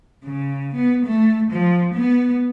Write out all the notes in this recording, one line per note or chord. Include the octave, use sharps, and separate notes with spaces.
C#3
B3
A3
F3
B3